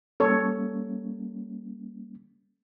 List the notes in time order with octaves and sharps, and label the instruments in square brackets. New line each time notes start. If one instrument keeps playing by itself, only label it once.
[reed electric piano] G3 A#3 C#4 [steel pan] A4 C#5